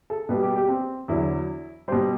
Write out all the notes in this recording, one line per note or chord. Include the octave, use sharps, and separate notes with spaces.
A4
B2 G3 B4
G4
G4
C4
E2 D3 F#3 E4
B2 G3 C5